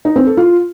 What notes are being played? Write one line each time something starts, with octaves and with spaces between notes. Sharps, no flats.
D#4
C4
A4
F4